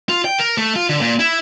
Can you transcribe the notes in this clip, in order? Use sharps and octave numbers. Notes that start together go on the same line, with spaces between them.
F4
G5
A#4
A3
F4
D3
A#2
E4